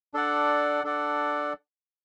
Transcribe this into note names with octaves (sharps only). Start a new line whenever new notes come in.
D4 A4 D5 F#5
D4 A4 D5 F#5